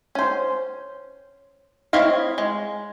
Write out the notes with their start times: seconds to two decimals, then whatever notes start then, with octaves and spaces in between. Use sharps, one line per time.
0.15 C#4 C5
1.93 C4 E4 C#5 D#5 F5
2.38 G#3